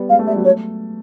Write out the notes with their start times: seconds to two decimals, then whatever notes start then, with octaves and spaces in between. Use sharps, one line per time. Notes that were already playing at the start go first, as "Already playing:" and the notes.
Already playing: G3 B3
0.09 G#3 F5
0.19 A3
0.27 G3 E5
0.36 F#3
0.45 A3 C#5